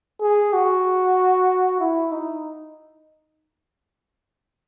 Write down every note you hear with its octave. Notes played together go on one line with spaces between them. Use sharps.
G#4
F#4
E4
D#4